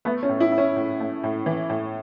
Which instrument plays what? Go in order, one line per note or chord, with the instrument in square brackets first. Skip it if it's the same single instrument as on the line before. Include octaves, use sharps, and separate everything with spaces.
[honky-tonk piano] A3 [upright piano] B3
[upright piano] C#4
[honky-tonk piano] A2
[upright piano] E4
[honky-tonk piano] E4
[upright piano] C#4
[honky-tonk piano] A2
A3
A2
E3
A2